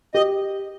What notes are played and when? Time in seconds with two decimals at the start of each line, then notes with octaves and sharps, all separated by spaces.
0.14 G4 D#5